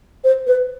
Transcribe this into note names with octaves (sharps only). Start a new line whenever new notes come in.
C5
B4